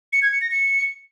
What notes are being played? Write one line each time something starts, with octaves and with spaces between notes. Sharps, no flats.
C#7
G#6
C#7
A#6
C#7